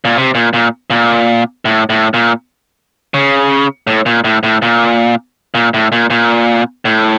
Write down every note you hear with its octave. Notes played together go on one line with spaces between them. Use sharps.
A#2
C3
A#2
A#2
A#2
A2
A2
A#2
C#3
A2
A#2
A2
A2
A#2
A#2
A2
A#2
A#2
A2